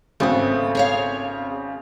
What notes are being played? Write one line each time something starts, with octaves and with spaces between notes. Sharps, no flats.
G#1 C#3 A3 B3 C4
G#4 C#5 F5